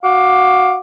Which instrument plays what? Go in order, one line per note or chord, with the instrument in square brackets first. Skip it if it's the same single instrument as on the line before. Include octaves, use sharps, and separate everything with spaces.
[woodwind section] F#4 F5 D6